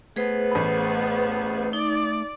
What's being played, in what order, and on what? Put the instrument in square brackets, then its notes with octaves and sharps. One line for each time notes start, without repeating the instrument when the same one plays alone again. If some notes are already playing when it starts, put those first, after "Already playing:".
[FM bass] A3 [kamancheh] B3 [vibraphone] G#4 B4 C5
[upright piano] A1 B5
[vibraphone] D#4 [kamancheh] D5